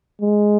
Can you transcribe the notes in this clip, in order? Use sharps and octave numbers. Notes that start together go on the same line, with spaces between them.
G#3